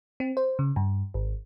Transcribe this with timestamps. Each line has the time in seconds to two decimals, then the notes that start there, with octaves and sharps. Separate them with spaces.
0.20 C4
0.37 C5
0.59 C#3
0.76 G2
1.14 G#1